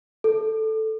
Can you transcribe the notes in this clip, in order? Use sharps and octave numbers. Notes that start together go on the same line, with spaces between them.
A4